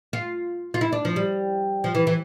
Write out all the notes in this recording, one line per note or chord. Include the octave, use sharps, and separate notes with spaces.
F4
F4
E4
D4
F3
G3
F3
E3
E3